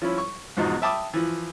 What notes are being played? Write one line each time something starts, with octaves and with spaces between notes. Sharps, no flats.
F3 C#4 E4
C#6
E2 G#2 B2 F3 D#4
E5 G5 A5 B5 D6 D#6
E3 F3